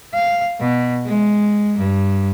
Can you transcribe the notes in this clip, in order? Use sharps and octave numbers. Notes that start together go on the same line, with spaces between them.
F5
B2
G#3
G2